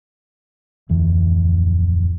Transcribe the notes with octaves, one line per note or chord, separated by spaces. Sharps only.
D1 F2 E3